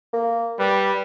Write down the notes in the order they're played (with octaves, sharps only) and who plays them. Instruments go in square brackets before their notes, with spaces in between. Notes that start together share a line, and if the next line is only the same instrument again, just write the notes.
[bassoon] A#3
[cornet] G3 [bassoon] B4